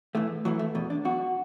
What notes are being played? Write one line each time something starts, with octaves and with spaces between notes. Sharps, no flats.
B1 A2 E3 A3
B1 A2 E3 F#3
A3
E2 B2
D4
B1 B2 F#4